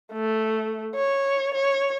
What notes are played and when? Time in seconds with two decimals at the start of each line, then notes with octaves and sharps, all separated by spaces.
0.13 A3
0.95 C#5
1.54 C#5